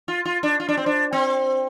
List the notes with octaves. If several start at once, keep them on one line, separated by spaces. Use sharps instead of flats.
F4
F4
D4
F4
D4
C4
D4
C4